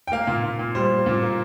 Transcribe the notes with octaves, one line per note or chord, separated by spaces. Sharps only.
G5
A#3 F5
A#2
A#2
A#2
G3 C5
G3
A#2
A#3